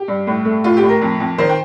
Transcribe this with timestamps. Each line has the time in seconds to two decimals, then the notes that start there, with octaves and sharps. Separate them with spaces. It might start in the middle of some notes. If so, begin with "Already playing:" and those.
Already playing: G4
0.08 G2
0.27 A2
0.45 A3
0.64 A2 F4
0.77 G4
0.83 A2
0.89 A#4
1.02 F2
1.20 F2
1.38 D#3 C5
1.49 G5